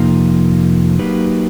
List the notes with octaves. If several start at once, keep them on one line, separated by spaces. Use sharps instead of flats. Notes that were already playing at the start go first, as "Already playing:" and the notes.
Already playing: F2 C3 F3 A#3 D#4
F#3 A#3 D#4 G4 B4